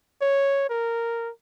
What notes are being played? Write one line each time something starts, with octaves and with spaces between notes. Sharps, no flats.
C#5
A#4